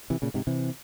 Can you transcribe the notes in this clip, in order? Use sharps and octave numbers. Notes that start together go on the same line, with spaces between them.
C3 E3
A#2 C#3
G#2 C3
C3 E3